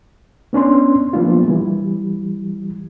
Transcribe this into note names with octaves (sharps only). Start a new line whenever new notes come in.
B3 C#4 D4 C6
F3 F#3 A#3 B3 D4 F4
E3 G3